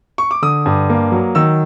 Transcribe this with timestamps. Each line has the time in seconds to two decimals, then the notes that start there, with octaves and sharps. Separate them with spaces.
0.18 C#6
0.31 D6
0.42 D3 D#6
0.66 G2
0.90 A#3
1.12 F#3
1.35 D#3 E6